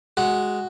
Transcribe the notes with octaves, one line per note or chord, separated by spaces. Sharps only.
G#3 F#4